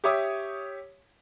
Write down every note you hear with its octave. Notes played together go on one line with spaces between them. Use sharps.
G4 C#5 E5 D6 D#6